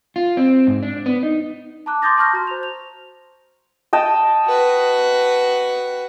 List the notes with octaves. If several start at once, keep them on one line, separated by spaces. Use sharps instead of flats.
F4
C4
G#2
D4
B3
D#4
A5 A#5 D6 F#6
C6 D6 D#6 G6 A6 A#6
A5 C6 C#6 F6 G6 A#6
F#4 A#5
C5 F7
F7
D#5 G5 A5
F#4 B4